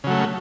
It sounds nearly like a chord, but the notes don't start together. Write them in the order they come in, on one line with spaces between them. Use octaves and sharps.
C#3 F#3 A3